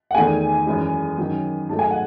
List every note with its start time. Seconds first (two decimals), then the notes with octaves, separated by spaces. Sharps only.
0.11 F#5
0.15 E2 D#3 A3 G#5
0.66 F#2 E3 G#3
1.18 F#2 D#3 F#3
1.69 G#2 F#3 A3 A5
1.79 G#5
1.91 F#5